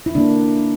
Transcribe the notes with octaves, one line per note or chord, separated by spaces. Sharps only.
E4
D3 A#3 D4